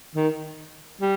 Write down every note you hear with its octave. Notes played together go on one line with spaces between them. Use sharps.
D#3
G3